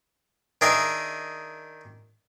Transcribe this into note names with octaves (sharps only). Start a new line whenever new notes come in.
D#3 D4 G#4 A#4 E5